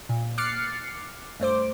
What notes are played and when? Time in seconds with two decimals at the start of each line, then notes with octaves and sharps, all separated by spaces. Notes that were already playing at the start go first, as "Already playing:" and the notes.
0.09 A#2
0.38 D6 F6 F#6 A6 C7 C#7
1.40 G2 A3 C5 D6